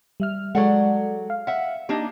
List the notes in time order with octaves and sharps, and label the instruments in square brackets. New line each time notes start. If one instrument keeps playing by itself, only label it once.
[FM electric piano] G3 E5 F6
[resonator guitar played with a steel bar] F#3 D5 F#5 [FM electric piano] G#3 A4
[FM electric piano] F5
[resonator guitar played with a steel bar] E5 F#5
[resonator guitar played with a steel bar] A#3 D4 D#4 [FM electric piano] G4 D#5